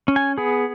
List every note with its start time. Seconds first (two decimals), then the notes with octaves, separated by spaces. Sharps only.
0.08 C#4
0.16 G#5
0.38 B3 G#4